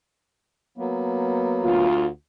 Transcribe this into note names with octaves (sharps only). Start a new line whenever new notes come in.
F#3 A#3 B3
D2 F4